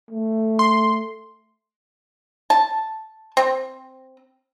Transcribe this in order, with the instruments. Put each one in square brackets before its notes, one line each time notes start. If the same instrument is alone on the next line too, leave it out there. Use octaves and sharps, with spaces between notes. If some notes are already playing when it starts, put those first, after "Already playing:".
[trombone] A3
[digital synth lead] C6
[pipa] A5
C4